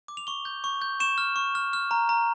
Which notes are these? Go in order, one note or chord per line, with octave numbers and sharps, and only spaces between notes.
D6
F7
C#6 G7
G6
C#6
G6
C#6 E7
F6
C#6
F6
F6
A#5
A#5